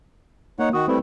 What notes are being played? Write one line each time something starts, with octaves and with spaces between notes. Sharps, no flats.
A#3 D#4 C#5 F#5
D#3 F#4 D#6
G3 A3 C4 E4 B4